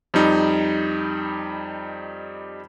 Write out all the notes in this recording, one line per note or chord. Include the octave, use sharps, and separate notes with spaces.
F2 G3 D#4